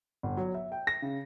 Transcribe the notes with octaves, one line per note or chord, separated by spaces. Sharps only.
G1
F#3
E5
G5
A#6
C#3